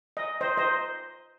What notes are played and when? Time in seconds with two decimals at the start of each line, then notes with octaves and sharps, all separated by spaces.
0.17 D#5
0.41 C5 D#5
0.57 C5 D#5